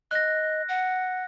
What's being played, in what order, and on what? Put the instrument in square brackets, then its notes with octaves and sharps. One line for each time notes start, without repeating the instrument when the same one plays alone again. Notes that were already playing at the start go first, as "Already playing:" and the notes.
[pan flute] D#5 [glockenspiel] F#6 A#6
[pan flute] F#5